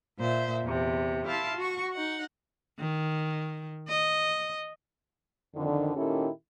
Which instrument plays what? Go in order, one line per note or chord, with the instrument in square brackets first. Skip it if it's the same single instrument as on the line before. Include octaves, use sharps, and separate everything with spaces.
[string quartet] A#2 C5 E5
E2 C3
E4 F5 A5 C6
F#4 C#6
D#4 F#5
[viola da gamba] D#3
D#5
[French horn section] F2 D3 D#3
A#2 D#3 C#4 E4 G4 A4